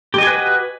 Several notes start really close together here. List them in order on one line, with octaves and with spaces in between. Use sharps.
G4 D#5 G#5 B4 F#4